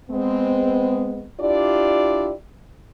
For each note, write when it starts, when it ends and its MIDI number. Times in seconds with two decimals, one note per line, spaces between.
0.11 1.27 56
0.11 1.27 59
0.11 1.27 60
1.40 2.32 62
1.40 2.32 64
1.40 2.32 65
1.40 2.32 67
1.40 2.32 74